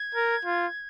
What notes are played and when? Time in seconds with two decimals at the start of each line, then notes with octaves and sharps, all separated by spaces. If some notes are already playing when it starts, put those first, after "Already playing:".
Already playing: G#6
0.15 A#4
0.45 F4